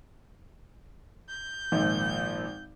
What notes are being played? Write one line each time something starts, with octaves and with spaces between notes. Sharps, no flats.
G6
G#1 A#2 F3